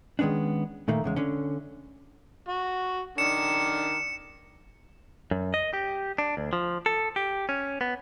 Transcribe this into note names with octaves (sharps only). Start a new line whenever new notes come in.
D#3 G#3 B3 C#4 D4
A#2 D#3 A3 A#3
E2 C#3 G#3
D3 C#4
F#4
D#3 D4 C#7 E7
F#2
D#5
G4
D4
D2
F3
A4
G4
C#4
B3